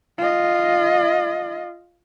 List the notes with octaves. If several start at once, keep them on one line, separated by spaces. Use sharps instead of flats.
F4 D#5